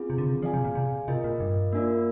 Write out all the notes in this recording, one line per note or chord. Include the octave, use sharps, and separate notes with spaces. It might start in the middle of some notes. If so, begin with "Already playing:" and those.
Already playing: C4 F4 G#4
C3
D3
C3
D#3
F3 G#4 D5 F5 G#5
C3
A#2
C3
C3 F4 A#4 D#5
A#2
G2
A#3 D4 F4 A#4 D5